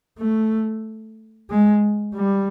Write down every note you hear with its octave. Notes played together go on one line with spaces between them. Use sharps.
A3
G#3
G3